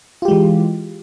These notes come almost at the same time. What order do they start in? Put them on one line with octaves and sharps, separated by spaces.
F4 G4 G#3 E3